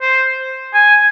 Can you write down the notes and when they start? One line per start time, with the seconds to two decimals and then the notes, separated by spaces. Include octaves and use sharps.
0.02 C5
0.74 G#5